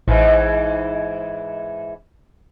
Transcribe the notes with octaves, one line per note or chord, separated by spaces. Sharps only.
A1 G#2 E3